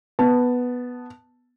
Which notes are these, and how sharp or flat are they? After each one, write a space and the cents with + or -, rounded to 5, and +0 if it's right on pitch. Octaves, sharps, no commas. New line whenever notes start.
B3 +0 A5 +0